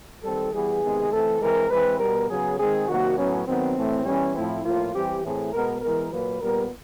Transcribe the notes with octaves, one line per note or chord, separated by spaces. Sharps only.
D#3 G3 C4 A4
E3 G3 B3 G#4
C3 D#3 G#3 B3
E3 A3 C4 A4
E3 G#3 C4 A#4
E3 G#3 C4 B4
B2 G3 B3 A#4
C#3 F#3 B3 G#4
D#3 G#3 C4 G#4
C3 D#3 F#3 A#3 F#4
A2 F#3 B3 C#4
D#3 F#3 B3 C4
A2 E3 A3
E3 G3 B3 C#4
A2 F3 A3 C4 E4
A2 F3 A#3 F4
E3 G3 C4 G4
A2 E3 A3 C4 G#4
B2 G#3 B3 A#4
E3 G#3 B3 A#4
A#2 F#3 A#3 B4
A#2 G3 B3 A#4